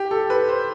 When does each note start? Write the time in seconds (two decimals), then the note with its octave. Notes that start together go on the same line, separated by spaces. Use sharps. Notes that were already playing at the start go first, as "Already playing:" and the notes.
Already playing: G4
0.11 A4
0.30 B4
0.49 C5